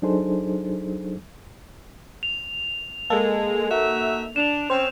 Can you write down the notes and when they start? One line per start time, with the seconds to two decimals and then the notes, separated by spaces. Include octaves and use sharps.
0.02 F#3 D4 D#4 G#4 A4 C5
2.23 F7
3.10 G#3 A#3 A4
3.70 D#4 F#4 E5
4.36 D4 E7 F7
4.70 C4 C#4 C5